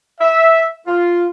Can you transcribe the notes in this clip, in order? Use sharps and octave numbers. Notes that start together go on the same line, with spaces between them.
E5
F4